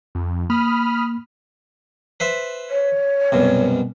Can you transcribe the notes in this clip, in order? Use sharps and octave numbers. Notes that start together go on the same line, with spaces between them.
F2
A#3 B5 D#6 F6
B4 C5 E5
C#5
C2 F#2 B2